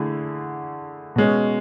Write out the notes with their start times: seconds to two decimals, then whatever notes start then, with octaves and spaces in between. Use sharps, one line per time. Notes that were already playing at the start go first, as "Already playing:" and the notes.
Already playing: D3 A3 E4 G#4
1.16 B2 G#3 C#4